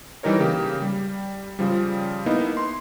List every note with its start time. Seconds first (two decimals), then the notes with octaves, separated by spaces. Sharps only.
0.23 E3 G3 D#4 A#4 C#5
0.40 C#3 A#3 G4
0.82 G3
1.59 C#3 F3 G3
2.26 A#3 B3 D#4 E4
2.57 C6